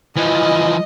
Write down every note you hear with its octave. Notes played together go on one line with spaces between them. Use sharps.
E3 F3 D#5